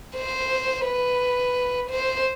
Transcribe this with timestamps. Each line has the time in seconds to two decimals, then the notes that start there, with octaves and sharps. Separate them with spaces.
0.16 C5
0.86 B4
1.90 C5